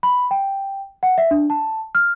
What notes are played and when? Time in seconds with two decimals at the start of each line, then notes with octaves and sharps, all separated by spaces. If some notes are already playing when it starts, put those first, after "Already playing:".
0.03 B5
0.31 G5
1.03 F#5
1.18 E5
1.31 D4
1.50 A5
1.95 F6